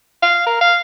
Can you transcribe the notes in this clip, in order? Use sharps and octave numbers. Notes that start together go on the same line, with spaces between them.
F5
A#4
F5